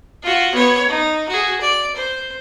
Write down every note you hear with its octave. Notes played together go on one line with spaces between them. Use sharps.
F4 F#4
B3 C#5
D#4
F#4 G#4
D5
C5